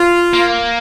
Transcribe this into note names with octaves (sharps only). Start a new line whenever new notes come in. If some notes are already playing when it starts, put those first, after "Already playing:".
Already playing: F4
A#3